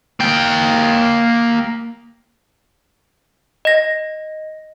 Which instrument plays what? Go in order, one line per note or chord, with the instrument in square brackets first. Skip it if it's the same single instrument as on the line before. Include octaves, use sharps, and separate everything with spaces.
[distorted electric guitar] A#3 G5
[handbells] D#5 A#6